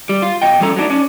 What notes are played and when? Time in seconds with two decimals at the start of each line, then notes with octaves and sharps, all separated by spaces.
0.09 G3
0.22 F4
0.42 B2 D#5 G5
0.60 E2 F3 G3 C#4 A4 A#5
0.76 F#3 A3 D4 D#4
0.90 C#4 D4 C#5